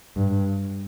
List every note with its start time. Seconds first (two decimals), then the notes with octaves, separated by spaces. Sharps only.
0.16 G2